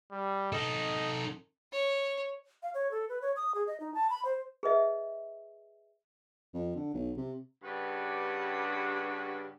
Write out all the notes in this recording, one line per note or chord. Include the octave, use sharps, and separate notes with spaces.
G3
D#4 A4 D#5
C#5
F5
C#5
A4
B4
C#5
D#6
G#4
D#5
D#4
A5
B5
C5
G#4 B4 D#5 E5
F2
D3
B1
C3
G2 C#3 D4 F#4 G4 B4